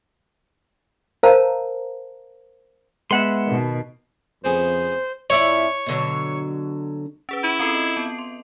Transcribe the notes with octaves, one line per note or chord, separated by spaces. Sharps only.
A#4 C5 C#5 F5 A5 A#5
G#3 B3 E5 F#5 C6
B2 D#3
F2 C#3 B3 G#4 C5
F2 E4 C#5 D5
B2 D3 F#3
C#4 G#4 B4
E4 D#7 E7
C4 F4 A4
D#5
B3 A5
C6